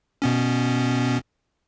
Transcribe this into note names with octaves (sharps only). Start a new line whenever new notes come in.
B2 B3 C#4